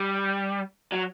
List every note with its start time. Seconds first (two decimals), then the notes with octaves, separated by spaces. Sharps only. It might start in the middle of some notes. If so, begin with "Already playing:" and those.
Already playing: G3
0.92 F#3